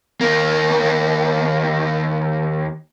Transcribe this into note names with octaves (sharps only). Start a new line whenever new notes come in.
D#2 A#3